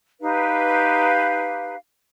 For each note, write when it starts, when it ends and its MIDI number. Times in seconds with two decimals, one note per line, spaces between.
0.21 1.75 63
0.21 1.75 67
0.21 1.75 71
0.21 1.75 77